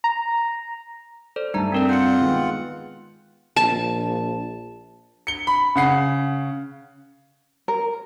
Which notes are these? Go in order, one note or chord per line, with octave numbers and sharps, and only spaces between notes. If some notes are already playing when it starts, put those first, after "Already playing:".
A#5
A4 C5 D5
G2 A3 D#4 A5 A#5
C4 D4 A#4 D5
F4 F#5 G6 C#7
D#3 G#3 B3
A#1 A5
C#7 G7
B5
C#3 F#5 C7
A#4